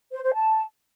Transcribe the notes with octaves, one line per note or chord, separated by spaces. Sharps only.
C5
C5
A5